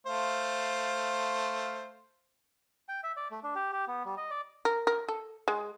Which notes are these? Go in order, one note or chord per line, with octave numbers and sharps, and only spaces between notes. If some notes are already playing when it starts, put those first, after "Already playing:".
A3 C5 F5
G5
E5
D5
A3
D4
G4
G4
B3
G3
D#5
D5
A#4
A#4
A4
G#3